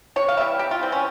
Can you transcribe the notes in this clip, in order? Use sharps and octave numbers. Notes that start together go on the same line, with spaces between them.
C3 C#5
F5
E3 G3 E5
C3 G4
F4
E3 G3 C4
C#4